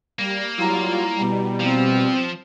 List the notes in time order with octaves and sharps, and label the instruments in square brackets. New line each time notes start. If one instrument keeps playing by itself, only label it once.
[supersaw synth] G3 [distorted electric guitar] A#3
[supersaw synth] F#3 G3 F4 [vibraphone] E4 A#5
[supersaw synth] B2 G3
[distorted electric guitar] F3 [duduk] C4